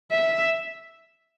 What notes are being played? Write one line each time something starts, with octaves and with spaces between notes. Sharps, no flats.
E5